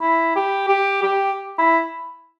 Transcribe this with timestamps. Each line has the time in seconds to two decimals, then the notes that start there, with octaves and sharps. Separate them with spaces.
0.01 E4
0.36 G4
0.69 G4
1.02 G4
1.58 E4